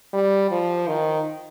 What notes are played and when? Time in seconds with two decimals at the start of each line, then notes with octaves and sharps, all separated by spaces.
0.13 G3
0.51 F3
0.87 D#3